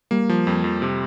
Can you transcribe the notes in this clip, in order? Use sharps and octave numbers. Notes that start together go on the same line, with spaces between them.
G3 A#3
F3
F2
F2
C3